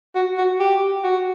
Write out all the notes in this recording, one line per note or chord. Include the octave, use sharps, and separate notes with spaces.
F#4
F#4
G4
F#4